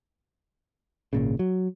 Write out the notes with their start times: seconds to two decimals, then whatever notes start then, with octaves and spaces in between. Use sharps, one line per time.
1.13 G#1 A#2 C#3
1.39 F#3